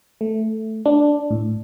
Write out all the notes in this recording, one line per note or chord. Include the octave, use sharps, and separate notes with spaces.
A3
D4
A2